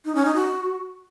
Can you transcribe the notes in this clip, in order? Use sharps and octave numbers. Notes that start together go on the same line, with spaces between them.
D#4
C#4
D#4
F#4